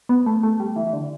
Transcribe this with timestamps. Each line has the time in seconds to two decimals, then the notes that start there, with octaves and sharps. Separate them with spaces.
0.09 B3
0.26 A3
0.43 A3
0.60 G3
0.76 E3
0.86 E3
0.93 D3